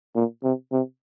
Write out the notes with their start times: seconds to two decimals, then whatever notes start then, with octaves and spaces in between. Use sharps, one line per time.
0.15 A#2
0.43 C3
0.72 C3